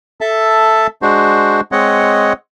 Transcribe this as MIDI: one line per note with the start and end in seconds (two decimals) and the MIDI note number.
0.21 0.87 69
0.21 0.87 76
0.21 0.87 81
1.02 1.61 56
1.02 1.61 62
1.02 1.61 66
1.02 1.61 72
1.72 2.33 56
1.72 2.33 60
1.72 2.33 73
1.72 2.33 75
1.72 2.33 78